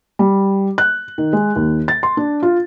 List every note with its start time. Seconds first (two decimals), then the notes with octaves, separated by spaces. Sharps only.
0.19 G3
0.78 F#6
1.18 D#3
1.33 G#3
1.56 D#2
1.88 A6
2.03 C6
2.17 D4
2.43 F4